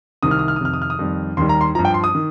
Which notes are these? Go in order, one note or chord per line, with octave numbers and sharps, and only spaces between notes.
C2 C3 D#3 D#6
F6
D#6
F6
D#6
F2 C3 D#3 F6
D#6
F6
D#6
F2 D#3 G3
D#2 D#3 G3 C6
A#5
C6
G2 F3 A#5
G5
C6
D#6
D#3